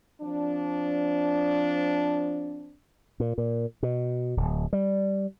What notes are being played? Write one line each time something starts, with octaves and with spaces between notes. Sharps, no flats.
F3 C4 D4
A#2
A#2
B2
D1
G3